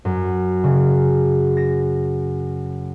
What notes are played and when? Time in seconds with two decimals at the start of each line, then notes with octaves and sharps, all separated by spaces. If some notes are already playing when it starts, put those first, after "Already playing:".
0.05 F#2
0.64 C#3
1.57 A#6